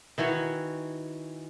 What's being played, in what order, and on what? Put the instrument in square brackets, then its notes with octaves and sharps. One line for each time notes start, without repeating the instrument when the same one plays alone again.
[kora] D#3 E3 F#4 C#5